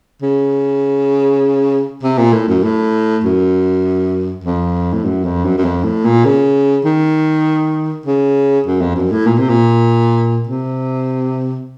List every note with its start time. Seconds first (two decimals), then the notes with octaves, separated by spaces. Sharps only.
0.22 C#3
2.03 C3
2.18 A#2
2.33 A2
2.48 F#2
2.63 A2
3.24 F#2
4.44 F2
4.93 A2
5.05 F#2
5.24 F2
5.45 F#2
5.58 F#2
5.65 F2
5.84 A2
6.05 A#2
6.25 C#3
6.85 D#3
8.06 C#3
8.67 F#2
8.81 F2
8.96 F#2
9.12 A2
9.27 A#2
9.38 C3
9.50 A#2
10.47 C3